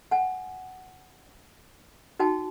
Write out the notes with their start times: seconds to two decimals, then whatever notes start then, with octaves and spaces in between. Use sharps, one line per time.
0.11 F#5 G#5
2.20 D#4 F#4 G5 A5